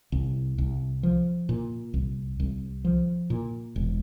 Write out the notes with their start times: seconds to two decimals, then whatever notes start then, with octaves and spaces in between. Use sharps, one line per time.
0.12 C2
0.58 C2
1.03 F3
1.49 A#2
1.94 C2
2.40 C2
2.85 F3
3.30 A#2
3.76 E1